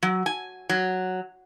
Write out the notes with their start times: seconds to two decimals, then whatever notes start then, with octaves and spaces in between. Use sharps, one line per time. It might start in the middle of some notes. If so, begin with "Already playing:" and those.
0.03 F#3
0.26 G#5
0.69 F#3